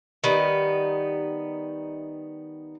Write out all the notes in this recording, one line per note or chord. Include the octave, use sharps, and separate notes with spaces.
D#3 G3 B3 D#4